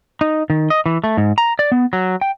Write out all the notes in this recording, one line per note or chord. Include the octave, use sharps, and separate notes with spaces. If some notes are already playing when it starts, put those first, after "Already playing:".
D#4
D#3
D#5
E3
A3
G#2
A#5
D5
B3
F#3
G5